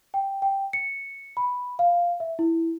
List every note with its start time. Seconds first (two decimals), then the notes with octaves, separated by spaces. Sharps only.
0.14 G5
0.42 G5
0.73 C#7
1.37 B5
1.79 F5
2.20 E5
2.39 E4